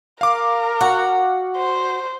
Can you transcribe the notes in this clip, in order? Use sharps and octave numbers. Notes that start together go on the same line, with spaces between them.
A#4 F5 D6
F#4
C5